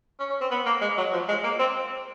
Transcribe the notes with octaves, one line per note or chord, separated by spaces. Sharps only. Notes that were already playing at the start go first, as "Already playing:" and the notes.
C#4
C#4
C4
B3
A#3
G#3
F#3
F3
G#3
A#3
C4